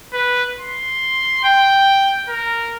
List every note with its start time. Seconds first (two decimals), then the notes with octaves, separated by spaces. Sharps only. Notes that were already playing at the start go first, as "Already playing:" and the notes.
0.13 B4
0.59 C6
1.44 G5
2.29 A#4